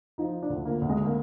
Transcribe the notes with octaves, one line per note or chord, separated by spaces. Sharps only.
F3 D#4
D4
D2
A#3
D2
G#3
A#3